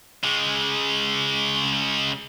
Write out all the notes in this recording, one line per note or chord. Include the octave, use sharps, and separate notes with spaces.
C#3 G#3